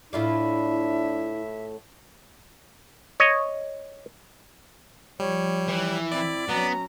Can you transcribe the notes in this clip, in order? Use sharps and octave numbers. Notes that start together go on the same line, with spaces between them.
A2 D4 E4 F4 D5 E5
C#5 D#5
F3 G3 C#5
E3
C4 E4 D5
F#3 B3 C#4 A#5